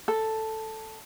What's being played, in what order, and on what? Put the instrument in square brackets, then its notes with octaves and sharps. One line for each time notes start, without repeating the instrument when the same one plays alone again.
[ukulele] A4